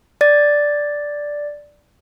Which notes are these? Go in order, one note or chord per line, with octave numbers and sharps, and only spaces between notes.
D5 A6